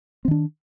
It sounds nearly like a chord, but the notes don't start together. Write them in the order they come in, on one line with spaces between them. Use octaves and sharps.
C4 D#3 D4